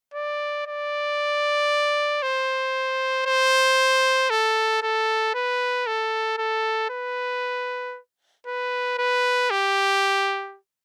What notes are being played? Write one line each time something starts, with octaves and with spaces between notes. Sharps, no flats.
D5
D5
C5
C5
A4
A4
B4
A4
A4
B4
B4
B4
G4